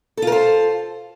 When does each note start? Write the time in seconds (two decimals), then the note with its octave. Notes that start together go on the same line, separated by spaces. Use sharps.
0.17 A4
0.22 F4
0.27 A#4
0.32 C5